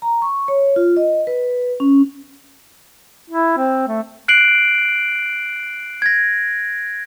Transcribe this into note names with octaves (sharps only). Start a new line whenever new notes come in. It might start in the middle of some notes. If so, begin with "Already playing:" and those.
A#5
C#6
C#5
F4
D#5
B4
C#4
E4
C4
A3
F#6 C7 D7 F#7
G#6 A#6